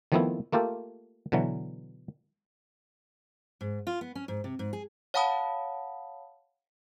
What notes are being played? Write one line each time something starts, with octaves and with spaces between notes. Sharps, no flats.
D#3 F3 A3 B3 C4 E4
A3 A#3 F4 G4 A4
B2 D3 E3 F#3
G#2
F4
B3
C#4
G#2
C3
G#2
G#4
C#5 F5 F#5 A5 B5 D#6